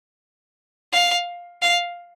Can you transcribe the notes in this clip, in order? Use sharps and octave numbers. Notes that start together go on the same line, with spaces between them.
F5
F5